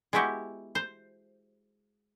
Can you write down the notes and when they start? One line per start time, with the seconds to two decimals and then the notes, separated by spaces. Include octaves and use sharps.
0.13 G#3 B3 E4 F#4 G4
0.75 C5